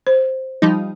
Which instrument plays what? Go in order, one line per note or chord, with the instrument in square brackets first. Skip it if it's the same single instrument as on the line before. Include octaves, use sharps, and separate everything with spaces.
[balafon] C5
[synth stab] F3 G3 D#4